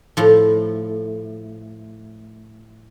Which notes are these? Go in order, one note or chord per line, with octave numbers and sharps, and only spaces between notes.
A2 F3